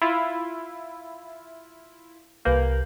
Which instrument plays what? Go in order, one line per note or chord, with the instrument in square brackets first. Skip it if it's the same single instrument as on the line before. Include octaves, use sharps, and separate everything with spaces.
[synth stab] E4 F4
[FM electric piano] C2 B4 G6 [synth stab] A#3